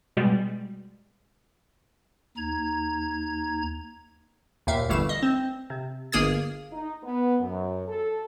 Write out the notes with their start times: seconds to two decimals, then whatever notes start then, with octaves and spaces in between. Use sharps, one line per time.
0.17 B2 G3 G#3
2.37 D#2 D#4 A#5 G#6
4.67 D#2 A#2 E5 F5
4.89 G1 E3 G3 A3 F5 E7
5.09 D#5
5.23 C4
5.70 C3
6.12 G1 A#3 G#4 D#6 G#6
6.73 D#4
7.03 B3
7.40 F#2
7.88 A4